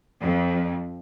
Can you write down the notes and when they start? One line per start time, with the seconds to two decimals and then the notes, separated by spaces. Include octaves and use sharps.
0.23 F2